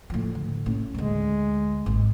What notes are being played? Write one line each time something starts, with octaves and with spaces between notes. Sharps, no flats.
A2 F3
D3
A2 C#4
D2 D3 G#3
G#1